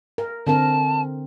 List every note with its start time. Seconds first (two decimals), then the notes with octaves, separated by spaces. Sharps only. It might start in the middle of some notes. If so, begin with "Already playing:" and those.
0.18 A#4
0.47 D3 C4 A#4 A5